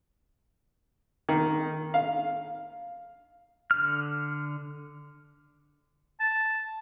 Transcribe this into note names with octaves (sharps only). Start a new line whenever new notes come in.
D#3
F5
D3 F6
A5